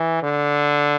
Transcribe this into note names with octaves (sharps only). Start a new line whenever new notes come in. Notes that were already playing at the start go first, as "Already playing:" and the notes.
Already playing: E3
D3